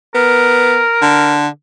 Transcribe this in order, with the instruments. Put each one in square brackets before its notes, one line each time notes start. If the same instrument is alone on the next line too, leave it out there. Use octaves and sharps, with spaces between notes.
[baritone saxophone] B3 [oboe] A#4
[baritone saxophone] D3